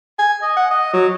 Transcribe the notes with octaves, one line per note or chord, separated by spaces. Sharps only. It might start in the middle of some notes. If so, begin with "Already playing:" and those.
G#5
D#5
F#5
D#5
F#3